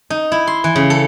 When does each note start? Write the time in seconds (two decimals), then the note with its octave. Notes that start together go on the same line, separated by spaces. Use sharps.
0.10 D#4
0.32 E4
0.47 C6
0.64 E3
0.76 C#3
0.90 A4